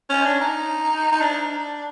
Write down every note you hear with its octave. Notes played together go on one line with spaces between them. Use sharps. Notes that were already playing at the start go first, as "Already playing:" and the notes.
C#4
D4
D#4
D#4
D4